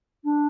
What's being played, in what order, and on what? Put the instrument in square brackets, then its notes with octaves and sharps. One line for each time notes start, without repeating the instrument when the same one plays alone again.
[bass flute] D4